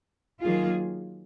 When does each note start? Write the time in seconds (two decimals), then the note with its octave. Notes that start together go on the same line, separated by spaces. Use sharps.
0.43 D#3 F#3 A#3 F4 G#4